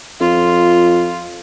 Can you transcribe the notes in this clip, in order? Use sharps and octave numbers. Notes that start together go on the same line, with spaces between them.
F2 F4